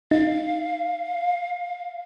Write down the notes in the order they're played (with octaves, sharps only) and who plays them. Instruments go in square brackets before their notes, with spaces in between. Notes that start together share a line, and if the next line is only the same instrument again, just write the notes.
[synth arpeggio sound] D#4 [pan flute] F5